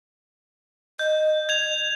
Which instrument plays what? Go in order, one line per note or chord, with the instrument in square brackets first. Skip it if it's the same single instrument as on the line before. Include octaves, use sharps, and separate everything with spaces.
[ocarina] D#5 [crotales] G6
[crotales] G#6 F7